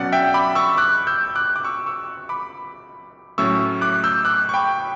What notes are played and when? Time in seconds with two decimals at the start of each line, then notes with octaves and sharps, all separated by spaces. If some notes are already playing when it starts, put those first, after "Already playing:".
Already playing: B2 F#3 C#4 D5 F#5
0.12 E5 G5
0.34 B5 D6
0.55 C#6 E6
0.78 D6 F#6
1.07 E6 G6
1.35 D6 F#6
1.56 D6
1.64 C#6 E6
1.86 C#6 E6
2.29 B5 D6
3.38 A2 F#3 A3 C#4 C#6 E6
3.81 D6 F#6
4.04 E6 G6
4.25 D6 F#6
4.49 C#6
4.54 G5 B5